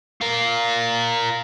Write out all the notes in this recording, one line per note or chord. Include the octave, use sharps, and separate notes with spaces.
F4 A#4